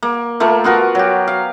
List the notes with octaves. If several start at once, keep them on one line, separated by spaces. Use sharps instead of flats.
A#3
A3 A#3 F4 A#4
B3 F4 F#4 A#4
F#3 G4
F5